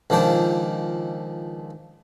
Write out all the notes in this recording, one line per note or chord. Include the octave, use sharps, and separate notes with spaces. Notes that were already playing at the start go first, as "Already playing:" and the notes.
C#2 D#3 F3 D4 C5